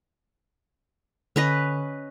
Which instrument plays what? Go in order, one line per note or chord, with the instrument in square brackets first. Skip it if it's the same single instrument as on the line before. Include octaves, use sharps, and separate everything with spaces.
[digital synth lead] D3 [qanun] C#4 B4 D#5